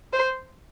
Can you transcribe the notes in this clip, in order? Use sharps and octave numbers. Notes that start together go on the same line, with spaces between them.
C5